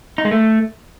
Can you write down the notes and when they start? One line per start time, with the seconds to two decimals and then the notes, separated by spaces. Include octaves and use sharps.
0.18 D#4
0.25 G#3
0.31 A3